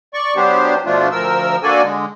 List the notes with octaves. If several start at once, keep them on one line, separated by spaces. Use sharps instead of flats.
D5 C#6
F#3 B3 D4 G4 C5
B2 F3 A3 D4 F4
D2 F3 A#4 E6
A#3 D4 F#4 A4 D5 G#5
D3 G#3